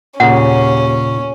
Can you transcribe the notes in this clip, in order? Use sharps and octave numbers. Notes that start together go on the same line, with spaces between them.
D#2 A#2 C#3 C#4 F#5